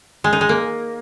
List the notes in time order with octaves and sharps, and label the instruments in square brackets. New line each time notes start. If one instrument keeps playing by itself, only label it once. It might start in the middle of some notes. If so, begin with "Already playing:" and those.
[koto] G#3
D#4
G#3
A#3